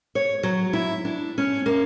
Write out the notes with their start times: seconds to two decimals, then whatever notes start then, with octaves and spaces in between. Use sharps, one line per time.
0.15 C#5
0.43 F#3
0.73 E4
1.05 D4
1.38 C#4
1.66 A#3